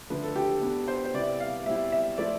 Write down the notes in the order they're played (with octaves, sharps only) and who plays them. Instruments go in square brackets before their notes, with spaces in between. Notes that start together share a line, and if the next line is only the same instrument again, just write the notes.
[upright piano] D3 F3 A3 D4 [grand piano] B4
[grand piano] A4
G4
A4
[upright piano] B2 B3 D4
[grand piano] C5
C5
[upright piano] C3 G3 B3 E4 [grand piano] D5
[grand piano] F5
[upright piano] B2 G3 C4 E4 [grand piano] E5
[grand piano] E5
[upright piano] F3 A3 C4 E4 [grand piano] D5